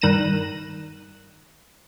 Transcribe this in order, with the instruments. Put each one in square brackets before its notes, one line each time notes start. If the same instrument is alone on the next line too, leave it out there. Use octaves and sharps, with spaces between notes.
[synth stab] G2 D#3 F#6 A#6 D#7 E7